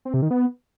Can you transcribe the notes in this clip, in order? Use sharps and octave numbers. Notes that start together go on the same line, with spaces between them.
C4
C3
D#3
B3